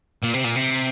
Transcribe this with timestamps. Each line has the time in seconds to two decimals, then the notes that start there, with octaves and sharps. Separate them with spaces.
0.23 A#2
0.34 C3
0.44 A#2
0.55 C3